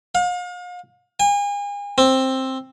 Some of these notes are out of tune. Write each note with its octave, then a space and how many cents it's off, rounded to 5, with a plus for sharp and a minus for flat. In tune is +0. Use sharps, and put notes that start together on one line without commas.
F5 +40
G#5 -40
C4 +10